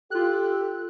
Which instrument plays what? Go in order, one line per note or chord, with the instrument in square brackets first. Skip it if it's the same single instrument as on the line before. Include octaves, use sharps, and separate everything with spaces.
[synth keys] F4 F#6 [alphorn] G4 [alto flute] A4